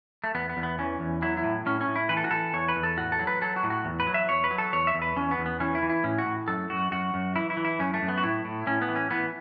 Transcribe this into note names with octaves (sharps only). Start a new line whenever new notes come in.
A3
E2 B3
B3
E2
B3
E3 C#4
E2
F#3 E4
E4
A2
A2 C#4
C#4
A2
E4
E3 B4
A4
F#4
E3 A4
E2 C#5
B4
E2
A4
A2 F#4
A4
F#3
B4
F#3 A4
F#4
A2
F#4
E2
B4
F#3
E5
E2 C#5
B4
F#3
A4
E2 C#5
E5
E2
B4
E2 C#4
B3
E2
B3
E3 C#4
E4
E3
E4
A2 C#4
F#4
A2
F#2 A4
F#2 F#4
F#2 F#4
F#2
E3 E4
E4
E3
E4
F#2 C#4
A3
F#2
B3
F#4
A2 E4
A2
A2 C#4
B3
E3
C#4
E3 B3